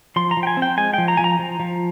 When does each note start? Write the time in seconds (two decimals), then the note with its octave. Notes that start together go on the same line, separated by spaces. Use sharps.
0.16 F3 C6
0.31 A#5
0.37 F3
0.43 G5
0.47 G#5
0.57 C4
0.62 G5
0.78 G#3 G#5
0.94 F3 G5
1.08 A#5
1.17 F3 G#5
1.24 A#5
1.39 F3
1.60 F3